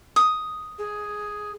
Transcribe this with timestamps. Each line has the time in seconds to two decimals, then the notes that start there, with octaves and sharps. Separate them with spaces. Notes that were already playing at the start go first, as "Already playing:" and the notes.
0.16 D#6
0.79 G#4